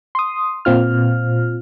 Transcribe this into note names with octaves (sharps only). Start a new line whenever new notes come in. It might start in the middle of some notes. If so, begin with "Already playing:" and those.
C6 D#6
A#2 C4 F4 F6